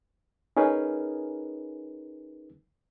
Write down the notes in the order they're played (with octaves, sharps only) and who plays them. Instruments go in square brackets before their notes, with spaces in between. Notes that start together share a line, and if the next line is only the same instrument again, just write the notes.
[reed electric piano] C#4 D#4 G#4 A#4 B4